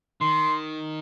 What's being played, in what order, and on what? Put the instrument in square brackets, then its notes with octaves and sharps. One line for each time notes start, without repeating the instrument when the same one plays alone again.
[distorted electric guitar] D#3 [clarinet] C6